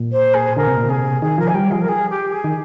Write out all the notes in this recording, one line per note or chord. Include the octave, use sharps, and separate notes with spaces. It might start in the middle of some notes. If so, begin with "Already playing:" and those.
Already playing: A#2
C5
G#4
D3 A#4
C3
A#2
C3 G#4
D#3 G#4
F3 A#4
G#5
G3 G5
F3 G#4
A#4
G#4
G4
G#4
D#3